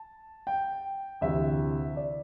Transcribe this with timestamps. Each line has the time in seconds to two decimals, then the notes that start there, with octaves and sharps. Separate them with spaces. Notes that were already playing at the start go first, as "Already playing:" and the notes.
Already playing: A5
0.47 G5
1.21 D2 C3 E3 E5
1.96 D5